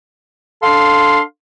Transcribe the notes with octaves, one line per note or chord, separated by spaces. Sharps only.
D4 A4 F5 C6